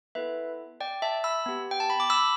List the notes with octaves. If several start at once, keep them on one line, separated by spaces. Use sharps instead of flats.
B3 E4 A4 B4 E5
D5 G5
E5 A5
B5 E6
B3 G4
G5
A5
B5
D6
B5 E6